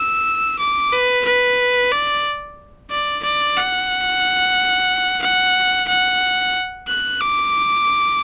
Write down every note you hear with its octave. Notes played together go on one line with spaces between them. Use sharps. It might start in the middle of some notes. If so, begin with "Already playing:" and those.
Already playing: E6
D6
B4
B4
D5
D5
D5
F#5
F#5
F#5
F#6
D6